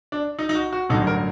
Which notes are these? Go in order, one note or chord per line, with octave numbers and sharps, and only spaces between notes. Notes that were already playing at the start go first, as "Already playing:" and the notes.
D4
D#4
D#4
F#4
F#4
A1 G2 D3 F#3 D#4
A#4